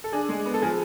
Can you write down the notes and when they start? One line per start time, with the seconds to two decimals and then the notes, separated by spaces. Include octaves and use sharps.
0.04 A4
0.12 D4 G#4
0.29 G#3
0.45 B3
0.54 A4
0.62 F3 G#4